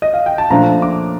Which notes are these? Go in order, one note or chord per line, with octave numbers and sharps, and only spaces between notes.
D#5
F5
G5
A5
A#2 F3 A3 D4 A#5
D6